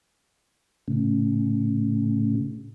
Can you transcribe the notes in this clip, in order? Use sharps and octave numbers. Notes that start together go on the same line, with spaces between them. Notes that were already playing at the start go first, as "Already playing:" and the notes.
A2 C#3